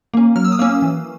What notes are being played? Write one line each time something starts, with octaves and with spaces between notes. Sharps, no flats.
A#3 C#4
F#3 F6
E6
D#6
A#3 C#4 E6
E3